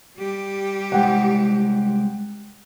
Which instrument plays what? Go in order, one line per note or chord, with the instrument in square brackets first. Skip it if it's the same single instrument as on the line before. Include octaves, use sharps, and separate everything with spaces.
[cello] G3 G4
[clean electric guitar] C2 G#3 C5 [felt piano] F#5 G5